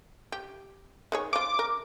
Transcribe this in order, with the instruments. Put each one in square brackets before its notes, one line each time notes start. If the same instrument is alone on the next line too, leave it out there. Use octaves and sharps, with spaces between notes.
[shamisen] G4
D#3 G#4 C#5
[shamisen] F3 F4 [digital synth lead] D6
[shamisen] A#4